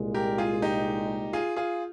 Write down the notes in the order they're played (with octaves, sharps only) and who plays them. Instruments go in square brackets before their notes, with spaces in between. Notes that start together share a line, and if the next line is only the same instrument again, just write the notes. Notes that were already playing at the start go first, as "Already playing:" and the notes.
Already playing: [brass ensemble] C2 A#2 G#3
[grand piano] G4 A#4
F4 G#4
D#4 G4
F4 G#4
F4 G#4